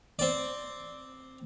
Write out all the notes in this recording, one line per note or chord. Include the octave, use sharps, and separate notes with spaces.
C4 D5